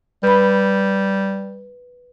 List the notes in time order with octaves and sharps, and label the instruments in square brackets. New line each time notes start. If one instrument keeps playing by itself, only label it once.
[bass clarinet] G3 [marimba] B4 B5